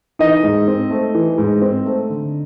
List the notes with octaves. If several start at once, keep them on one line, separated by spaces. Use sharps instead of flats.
E3 D#4 D#5
G#2
C4
A3
E3
G#2
C4
A3
D3